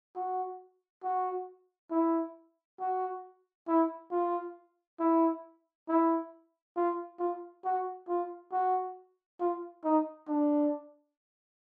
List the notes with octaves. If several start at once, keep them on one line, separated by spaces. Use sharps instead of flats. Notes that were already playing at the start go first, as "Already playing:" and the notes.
F#4
F#4
E4
F#4
E4
F4
E4
E4
F4
F4
F#4
F4
F#4
F4
D#4
D4